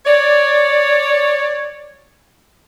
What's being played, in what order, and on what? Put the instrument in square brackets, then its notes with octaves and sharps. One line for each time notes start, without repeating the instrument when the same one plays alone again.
[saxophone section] C#5 D5